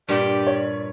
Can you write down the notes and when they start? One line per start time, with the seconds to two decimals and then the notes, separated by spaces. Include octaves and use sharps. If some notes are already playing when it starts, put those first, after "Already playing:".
0.09 G2 A#2 G4 D5
0.47 C#5